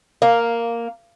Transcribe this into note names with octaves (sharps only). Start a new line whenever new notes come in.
A#3